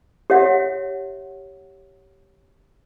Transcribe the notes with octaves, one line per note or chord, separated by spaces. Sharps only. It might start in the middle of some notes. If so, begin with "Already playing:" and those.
G4 C#5 E5 F#5